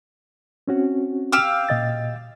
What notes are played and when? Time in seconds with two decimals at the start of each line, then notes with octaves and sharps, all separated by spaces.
0.68 C4 C#4 F#4
1.33 G4 F5 E6
1.69 A#2 D#5 A6